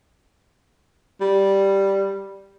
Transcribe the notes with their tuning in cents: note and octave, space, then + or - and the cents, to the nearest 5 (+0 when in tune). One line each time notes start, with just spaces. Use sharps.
G3 -5